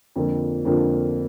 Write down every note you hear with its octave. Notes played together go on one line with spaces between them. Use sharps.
F2 D3 F3 A#3
F2 D3 F3 A#3